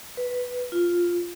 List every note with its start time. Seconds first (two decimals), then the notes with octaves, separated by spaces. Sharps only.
0.17 B4
0.72 F4